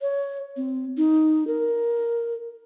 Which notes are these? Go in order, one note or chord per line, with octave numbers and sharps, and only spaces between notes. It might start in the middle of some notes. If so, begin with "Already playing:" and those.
C#5
C4
D#4
A#4